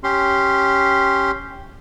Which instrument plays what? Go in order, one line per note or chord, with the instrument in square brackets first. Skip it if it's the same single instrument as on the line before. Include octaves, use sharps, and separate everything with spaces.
[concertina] C#4 G4 C6